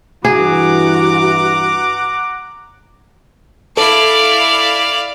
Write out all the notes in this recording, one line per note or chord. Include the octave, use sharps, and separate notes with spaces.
G2 E3 F#4 G#4 F#5 A#5 D6
E4 A4 D5 F5